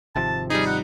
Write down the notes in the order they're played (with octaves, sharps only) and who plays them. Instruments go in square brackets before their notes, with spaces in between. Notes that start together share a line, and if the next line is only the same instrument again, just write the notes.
[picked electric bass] G#1 C3 F3 [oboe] A5
[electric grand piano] G3 D#4 [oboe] G#4
[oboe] F#5